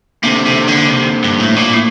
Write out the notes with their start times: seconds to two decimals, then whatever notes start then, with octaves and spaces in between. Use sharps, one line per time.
0.23 C3 A#3 D4 A4 C5
0.46 C3
0.68 D3
0.90 C3
1.24 G2
1.39 A2
1.56 A#2
1.73 A2